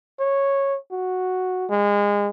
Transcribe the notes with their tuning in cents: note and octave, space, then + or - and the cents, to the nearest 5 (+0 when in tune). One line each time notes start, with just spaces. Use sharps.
C#5 -10
F#4 -5
G#3 -25